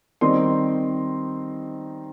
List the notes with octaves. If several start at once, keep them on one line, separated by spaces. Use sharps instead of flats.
D#3 G3 C4 D#4 C6